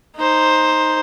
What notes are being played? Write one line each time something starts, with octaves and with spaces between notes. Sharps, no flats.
D#4 C5